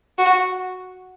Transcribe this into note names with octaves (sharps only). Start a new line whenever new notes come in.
F#4